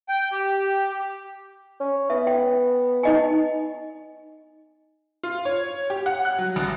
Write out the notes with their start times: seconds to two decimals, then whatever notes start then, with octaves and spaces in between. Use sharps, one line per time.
0.09 G5
0.32 G4
1.80 C#4
2.10 B3 E5
2.27 G5
3.03 D#4 D#5 G#5
5.23 F4
5.45 C#5
5.90 G4
6.06 F#5
6.25 F#6
6.39 F#3
6.56 A1